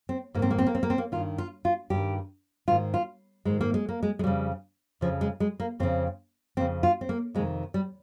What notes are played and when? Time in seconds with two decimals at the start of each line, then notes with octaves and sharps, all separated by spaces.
0.09 C4
0.34 G#2 A#3
0.39 D#3 C4
0.51 A#3
0.58 C4
0.67 A#3
0.75 C4
0.83 A#3
0.90 C4
0.98 A#3
1.12 D#3 F4
1.16 G2
1.38 F4
1.65 F4
1.90 G2 D#3 G4
2.68 G#2 D#3 F4
2.94 F4
3.45 G#2 D#3 G#3
3.61 A#3
3.74 G#3
3.89 A#3
4.03 G#3
4.19 G#3
4.24 F2 C#3 G3
5.01 F2 C#3 F3
5.21 G#3
5.40 G#3
5.60 A#3
5.80 F2 C#3 C4
6.57 F2 C#3 C4
6.83 F4
7.01 C4
7.09 A#3
7.35 F2 C3 D#3 G#3
7.74 G3